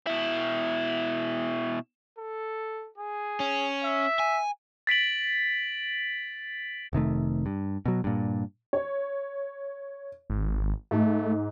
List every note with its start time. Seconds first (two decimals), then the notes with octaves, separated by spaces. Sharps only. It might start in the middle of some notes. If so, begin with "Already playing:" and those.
0.07 B2 E4
2.18 A4
2.98 G#4
3.40 C#4
3.84 E5
4.19 G#5
4.87 A6 B6 D7 F#7
6.93 F1 C3 D#3 A3
7.46 G2
7.86 B2 F#3
8.04 G2 A#2
8.73 C#5
10.30 G#1
10.91 G#2 A3